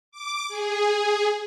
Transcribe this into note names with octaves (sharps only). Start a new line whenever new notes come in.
D6
G#4